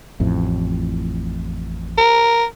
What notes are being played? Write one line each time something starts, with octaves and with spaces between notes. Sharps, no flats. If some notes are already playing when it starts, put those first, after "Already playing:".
A1 F2 A2
A#4